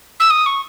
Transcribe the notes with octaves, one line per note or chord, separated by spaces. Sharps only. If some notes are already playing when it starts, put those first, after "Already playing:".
E6
D#6
C#6